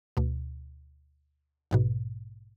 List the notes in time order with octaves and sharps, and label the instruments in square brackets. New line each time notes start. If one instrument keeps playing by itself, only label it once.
[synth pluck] D2 B2
A#1 G#2 B2